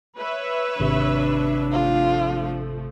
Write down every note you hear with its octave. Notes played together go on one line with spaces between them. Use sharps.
B4 C#5 E5
G#1 C3 D4
F3 A3 F4